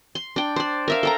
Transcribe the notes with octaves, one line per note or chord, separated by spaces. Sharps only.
C6
D4 G5
C5 D5
A#4 E5 F5
A4 G5 A#5